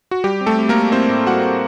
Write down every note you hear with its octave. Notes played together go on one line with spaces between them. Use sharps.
F#4
G3 G4
C4
A3 A4
C4
A#3 A#4
C4
A2 C4 C5
A2
G3 F#4 F#5
C4